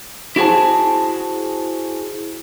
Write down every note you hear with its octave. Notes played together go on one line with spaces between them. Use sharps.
E4 F#4 G#4 C5 A5